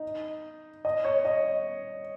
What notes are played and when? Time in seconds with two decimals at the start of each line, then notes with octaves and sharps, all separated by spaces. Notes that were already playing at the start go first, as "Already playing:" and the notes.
Already playing: D#4
0.85 D#5
1.05 C#5
1.25 D#5